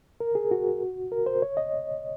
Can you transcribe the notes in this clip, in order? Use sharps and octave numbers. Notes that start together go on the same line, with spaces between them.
A#4
G#4
F#4
A#4
C5
C#5
D#5